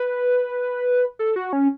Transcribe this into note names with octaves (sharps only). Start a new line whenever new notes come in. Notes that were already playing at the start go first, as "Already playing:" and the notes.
Already playing: B4
A4
F#4
C#4